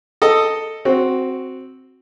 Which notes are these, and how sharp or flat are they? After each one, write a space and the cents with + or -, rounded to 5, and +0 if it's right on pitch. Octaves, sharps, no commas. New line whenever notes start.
A4 +10 D#5 +0
C4 +0 F#4 +0